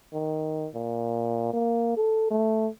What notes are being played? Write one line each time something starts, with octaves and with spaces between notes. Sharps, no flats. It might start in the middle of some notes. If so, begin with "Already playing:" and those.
D#3
A#2
A#3
A4
A3